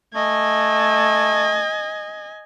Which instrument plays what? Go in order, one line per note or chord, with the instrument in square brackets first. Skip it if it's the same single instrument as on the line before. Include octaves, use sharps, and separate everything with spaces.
[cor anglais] A3 [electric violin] D#5 G#5